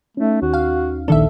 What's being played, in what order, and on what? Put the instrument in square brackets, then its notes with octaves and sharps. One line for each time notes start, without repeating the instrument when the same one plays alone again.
[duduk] A3 [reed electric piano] C#4 D#4
[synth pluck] D#2 [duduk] F#4
[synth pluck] F5
[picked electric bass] A#1 D#3 D4 [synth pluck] A4 E5